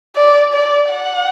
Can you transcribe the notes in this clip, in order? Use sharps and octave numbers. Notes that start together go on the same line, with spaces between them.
D5
D5
F#5